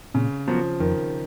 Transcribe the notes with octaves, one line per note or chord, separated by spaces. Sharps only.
A#2 C#3
F3 F#3 B3 F#4 A#4
F2 D#3